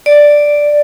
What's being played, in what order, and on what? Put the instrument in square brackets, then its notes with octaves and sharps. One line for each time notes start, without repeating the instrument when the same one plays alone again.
[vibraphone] D5